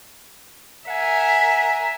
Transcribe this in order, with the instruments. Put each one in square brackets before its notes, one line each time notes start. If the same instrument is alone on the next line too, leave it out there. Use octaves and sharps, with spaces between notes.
[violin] A#4 E5 [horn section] F#5 G#5